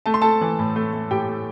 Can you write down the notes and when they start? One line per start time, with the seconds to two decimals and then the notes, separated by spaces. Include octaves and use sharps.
0.06 A3 A5
0.14 C6
0.22 A3 A4 A5
0.41 E3
0.59 A2
0.76 A3
0.93 A3
1.11 A2 G4 G5
1.28 A3